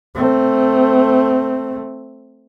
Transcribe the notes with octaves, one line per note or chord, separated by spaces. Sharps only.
A3 C4